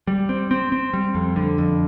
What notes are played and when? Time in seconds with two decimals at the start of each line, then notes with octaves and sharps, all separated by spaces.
0.07 G3
0.29 C4
0.51 C4
0.72 C4
0.93 G3
1.15 F2
1.36 D3
1.58 F2